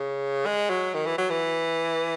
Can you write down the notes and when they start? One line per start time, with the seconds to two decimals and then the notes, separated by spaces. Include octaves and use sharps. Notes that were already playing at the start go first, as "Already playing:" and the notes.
Already playing: C#3
0.46 G#3
0.69 F#3
0.94 D#3
1.06 E3
1.18 F#3
1.30 E3